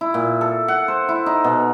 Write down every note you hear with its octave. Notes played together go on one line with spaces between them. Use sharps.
E4
A#2
A4
F#5
C5
E4
D#4
B2